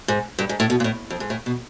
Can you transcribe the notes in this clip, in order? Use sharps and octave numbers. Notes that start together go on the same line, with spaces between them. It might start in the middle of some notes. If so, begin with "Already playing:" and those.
G#2
G2
G#2
A2
B2
A#2
A2
F2
G#2
A2
B2